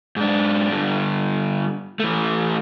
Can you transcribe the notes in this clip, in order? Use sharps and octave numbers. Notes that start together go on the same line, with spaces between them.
G#2 D4
G2 D3
E3 A3